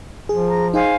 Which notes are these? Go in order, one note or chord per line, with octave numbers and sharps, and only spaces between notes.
F3 G#4
A#5
D#4 G#4 C5 F5 G#5